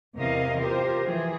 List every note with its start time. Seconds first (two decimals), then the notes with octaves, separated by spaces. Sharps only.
0.16 E2 C3 E3 A#4 D#5 F5
0.59 F4 G4 A#4 C5
1.05 E3 F3 G#4